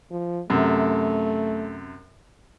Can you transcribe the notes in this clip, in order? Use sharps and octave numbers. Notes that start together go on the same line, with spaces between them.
F3
F#2 C3 A3